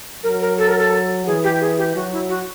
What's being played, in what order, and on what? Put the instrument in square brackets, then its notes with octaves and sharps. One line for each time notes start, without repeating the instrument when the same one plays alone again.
[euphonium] F#3 [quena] A#4
[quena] A#4
A4
A#4
A4
[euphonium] E3 [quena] G#4
[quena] G4
G#4
G4
[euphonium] F#3 [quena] F#4
[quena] E4
F#4